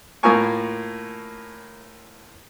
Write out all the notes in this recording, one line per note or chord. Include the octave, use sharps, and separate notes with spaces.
A2 A#3 F4 A#4 G#5 C#6